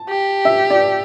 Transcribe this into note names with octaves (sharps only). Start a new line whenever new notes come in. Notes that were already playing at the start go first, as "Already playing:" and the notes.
Already playing: A5
G4
E5
D5